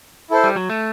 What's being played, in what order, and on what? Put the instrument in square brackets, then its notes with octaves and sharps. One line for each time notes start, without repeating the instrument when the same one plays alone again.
[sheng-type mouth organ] E4 A4 C5
[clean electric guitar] G3
F#3
A3